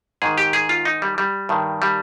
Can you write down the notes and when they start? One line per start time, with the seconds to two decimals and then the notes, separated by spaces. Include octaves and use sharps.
0.22 G#2 D#3 G#4
0.38 G4
0.53 G#4
0.69 F4
0.85 D#4
1.02 G3
1.18 G3
1.49 G2 D#3
1.82 G3